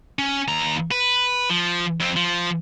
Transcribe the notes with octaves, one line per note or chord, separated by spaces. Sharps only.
C#4
D#2 A#5
B4
F3
F2 C4
F3